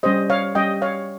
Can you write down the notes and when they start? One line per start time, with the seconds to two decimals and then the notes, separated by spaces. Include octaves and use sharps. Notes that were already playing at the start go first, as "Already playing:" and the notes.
0.03 G3 C#4 G4 C5 D#5
0.30 C#5 F5
0.55 G3 C#4 G4 D#5 G5
0.82 C#5 F5